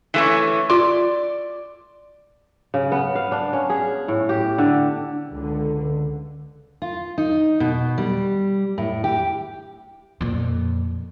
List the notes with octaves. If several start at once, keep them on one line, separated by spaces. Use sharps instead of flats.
E3 A3 C#4
F4 D5 C6
C#3
B3
F5
D4
C#4
G#4
A2
G4
D3
C#2 D3
F4
D#4
B2
G3
A2
G4
F2 A#2